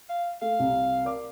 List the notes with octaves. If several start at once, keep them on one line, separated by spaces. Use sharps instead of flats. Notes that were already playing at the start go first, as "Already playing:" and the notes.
F5
A3 F5
C2
A#4 D5 D6